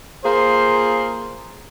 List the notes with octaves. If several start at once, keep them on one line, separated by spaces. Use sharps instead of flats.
A#3 F4 G#4 C5